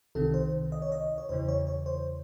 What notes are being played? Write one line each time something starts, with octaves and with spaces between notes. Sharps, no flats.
C2 C3 D#3 A4
C5
D#5
C#5
D#5
C#5
E2 C#3 E3 C5
C#5
C#5
C5